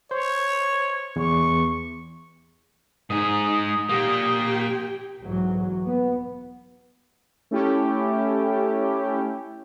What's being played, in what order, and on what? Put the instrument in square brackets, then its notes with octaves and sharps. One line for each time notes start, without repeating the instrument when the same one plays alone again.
[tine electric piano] C5 [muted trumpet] C#5
[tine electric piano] E2 [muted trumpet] C#6
[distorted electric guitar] G#2 G#4 [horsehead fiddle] D#4 [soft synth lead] D#6
[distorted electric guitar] A#2 A#3 [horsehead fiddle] G4 G5
[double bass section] B1 G#2 E3 F#3
B3
[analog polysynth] A3 C#4 E4 G4